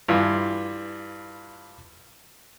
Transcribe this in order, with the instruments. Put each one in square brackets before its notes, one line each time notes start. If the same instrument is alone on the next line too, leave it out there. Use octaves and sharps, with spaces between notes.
[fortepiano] G2 E3 F4